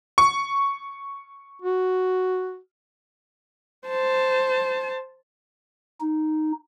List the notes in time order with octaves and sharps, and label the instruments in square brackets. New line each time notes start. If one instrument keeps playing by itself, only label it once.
[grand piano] C#6
[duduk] F#4
[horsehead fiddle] C5 A5
[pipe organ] D#4